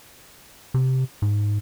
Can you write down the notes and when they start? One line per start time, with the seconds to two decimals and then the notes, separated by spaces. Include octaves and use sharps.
0.74 C3
1.22 G#2